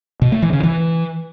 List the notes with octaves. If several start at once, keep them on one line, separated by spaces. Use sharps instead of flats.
B2
A3
E3
C#3
E3